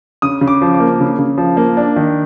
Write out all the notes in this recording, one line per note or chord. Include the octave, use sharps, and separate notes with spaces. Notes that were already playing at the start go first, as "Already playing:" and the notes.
C#3 D#6
C#3
D6
F3
D6
A#3
C#3
C#3
F3
A#3
D4
D#3